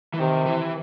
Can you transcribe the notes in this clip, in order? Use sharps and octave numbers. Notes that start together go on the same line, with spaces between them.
E3
C3 D#3
E3